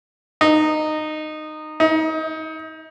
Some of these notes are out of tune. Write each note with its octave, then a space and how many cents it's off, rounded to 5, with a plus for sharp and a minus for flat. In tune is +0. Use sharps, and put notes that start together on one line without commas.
D#4 -15
D#4 +30